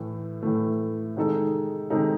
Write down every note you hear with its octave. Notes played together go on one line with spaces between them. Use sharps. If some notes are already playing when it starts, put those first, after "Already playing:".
Already playing: A2 E3 A3
A2 E3 A3
C3 D#3 G#3 D#4 A4
C3 D#3 G#3 D#4 A4